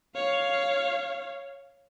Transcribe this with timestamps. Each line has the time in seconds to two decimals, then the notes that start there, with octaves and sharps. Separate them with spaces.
0.15 C#5 F5